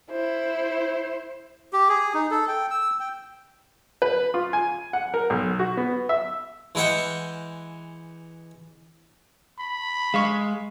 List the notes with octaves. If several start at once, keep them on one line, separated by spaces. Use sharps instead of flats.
E4 C5
G4
G#4
D#4
A4
G5
E6
G5
B4
F4
G#5
F#5
A#4
B1
F#4
B3
E5
E3 G#3 E5 F#5 G5
B5
G#3 F5 C#6